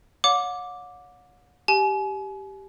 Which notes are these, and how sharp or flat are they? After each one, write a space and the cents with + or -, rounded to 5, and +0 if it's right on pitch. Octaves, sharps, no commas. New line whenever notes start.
C#5 +35 F#5 -40 D6 +0
G4 -5 G#5 +35